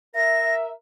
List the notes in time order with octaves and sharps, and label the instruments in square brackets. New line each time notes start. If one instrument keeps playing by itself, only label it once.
[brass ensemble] A#4 E5 [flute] A#6